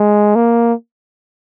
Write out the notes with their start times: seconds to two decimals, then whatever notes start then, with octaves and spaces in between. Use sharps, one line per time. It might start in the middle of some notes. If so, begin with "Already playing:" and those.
Already playing: G#3
0.35 A#3